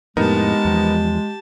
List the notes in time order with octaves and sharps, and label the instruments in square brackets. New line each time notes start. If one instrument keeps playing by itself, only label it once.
[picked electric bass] F2 A2 [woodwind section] G#3 [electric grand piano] B3 D#4 A#4 [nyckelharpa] G4 A5
[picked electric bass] E2 F3